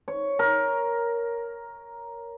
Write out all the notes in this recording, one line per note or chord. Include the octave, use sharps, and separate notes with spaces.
C#5
A#4